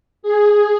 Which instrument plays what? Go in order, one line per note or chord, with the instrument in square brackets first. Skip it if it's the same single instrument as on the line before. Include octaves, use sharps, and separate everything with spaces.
[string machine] G#4